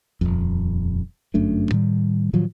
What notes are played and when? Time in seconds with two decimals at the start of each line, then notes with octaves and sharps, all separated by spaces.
0.21 D#1 G#1 F2
1.34 G1 F#2 A3 D4
1.71 A2 D#3 G3
2.33 A2 D#3 F3 F#3